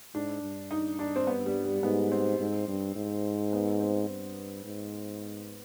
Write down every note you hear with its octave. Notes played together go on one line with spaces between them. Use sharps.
G#2 D4
G2
D#4
D4
C4
B3
G3
G3
G#2 B3
C4
G#2
G2
G#2
B3
C4
G2
G#2